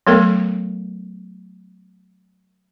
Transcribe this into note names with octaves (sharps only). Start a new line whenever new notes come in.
F#3 A3 B3 A4 A#4